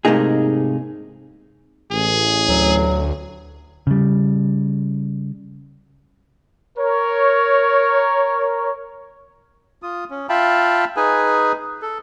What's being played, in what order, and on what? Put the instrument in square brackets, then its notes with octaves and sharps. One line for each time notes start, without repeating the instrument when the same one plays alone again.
[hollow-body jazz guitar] G#2 C3 A3 A#3 D#4 G#4
[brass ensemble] A1 [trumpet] G#4
[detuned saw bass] D2 [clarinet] F#3
[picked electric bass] C#3 G3
[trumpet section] A#4 C#5
[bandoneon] F4 D#6
C#4
F4 E5 F5 G5 A5 B5
D#4 G#4 B4 G#5
A4